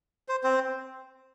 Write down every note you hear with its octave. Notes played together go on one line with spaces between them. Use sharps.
C5
C4 C5